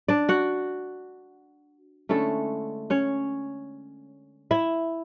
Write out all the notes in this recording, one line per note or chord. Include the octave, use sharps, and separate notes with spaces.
D4 D5
F#4 F#5
D3 G#3 A3 C#4 E4 A4
C#4 C#5
E4 E5